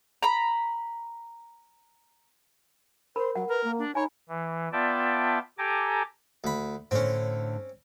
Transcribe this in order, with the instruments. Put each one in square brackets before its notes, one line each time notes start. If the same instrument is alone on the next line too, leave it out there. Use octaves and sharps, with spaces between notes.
[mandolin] A#5 B5
[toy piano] A#4 B5 [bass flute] C5
[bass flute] F#3 [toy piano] F#5
[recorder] A#4 [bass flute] B4
[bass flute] A#3
[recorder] D4
[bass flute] D#4 [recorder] C#5 [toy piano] G#5 B5
[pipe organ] E3
B3 F4 D5 E5 G5 A5
G4 A4 G5 G#5 A#5 D6
[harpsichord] D2 B5
[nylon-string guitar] A2 D3 [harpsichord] C4 C#4